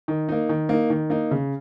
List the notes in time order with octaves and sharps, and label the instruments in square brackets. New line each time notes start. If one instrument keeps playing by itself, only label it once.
[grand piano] D#3
A#3 D#4
D#3
A#3 D#4
D#3
A#3 D#4
C#3